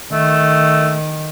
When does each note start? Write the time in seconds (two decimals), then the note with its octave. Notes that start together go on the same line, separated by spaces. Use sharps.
0.13 D#3 A3